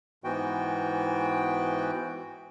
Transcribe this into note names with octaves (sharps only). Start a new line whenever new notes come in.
G#2 E3 B3 F#4 G5